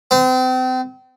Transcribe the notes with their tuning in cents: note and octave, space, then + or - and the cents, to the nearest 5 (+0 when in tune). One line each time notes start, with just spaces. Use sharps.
C4 -35